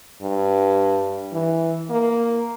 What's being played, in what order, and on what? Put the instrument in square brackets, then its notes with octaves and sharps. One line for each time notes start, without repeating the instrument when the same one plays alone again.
[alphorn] G2
E3
A#3